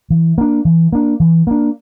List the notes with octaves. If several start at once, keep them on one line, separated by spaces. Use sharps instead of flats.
E3
A#3 D4
E3
A#3 D4
E3
A#3 D4